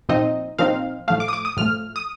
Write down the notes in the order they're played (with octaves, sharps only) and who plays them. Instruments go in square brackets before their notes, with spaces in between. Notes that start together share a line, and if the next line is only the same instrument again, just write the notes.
[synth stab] A#2 F3 C4 D#4 D#5
A#2 F3 C4 D#4 F5
A2 F3 A3 F5
D6
D#6
D6
D#6
A2 F3 A3 F6
D#6